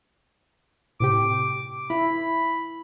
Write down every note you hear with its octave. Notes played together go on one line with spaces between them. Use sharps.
A2 C3 G4 D6
E4 B5